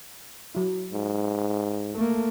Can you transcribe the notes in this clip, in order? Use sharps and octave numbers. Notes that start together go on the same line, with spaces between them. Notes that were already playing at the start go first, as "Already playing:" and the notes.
F#3 E4
G#2
A3 A#3 A4